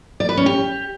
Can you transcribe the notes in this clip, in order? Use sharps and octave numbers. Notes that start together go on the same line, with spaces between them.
D5
B4
C#4
G4